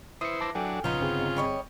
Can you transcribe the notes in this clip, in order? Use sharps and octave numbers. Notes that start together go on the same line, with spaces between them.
E3 E4 C5 D#6 C#7
A5 D6 A#6
F#3 D4 A4 G5 G#5
A#1 C#3 B3 D#4 F4
G1 C4 G#4
G3 C#5 D#5